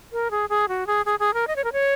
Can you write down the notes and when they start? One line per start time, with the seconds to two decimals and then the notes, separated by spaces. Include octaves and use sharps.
0.13 A#4
0.31 G#4
0.49 G#4
0.68 F#4
0.87 G#4
1.06 G#4
1.20 G#4
1.34 A#4
1.47 D#5
1.56 C#5
1.64 A#4
1.73 C#5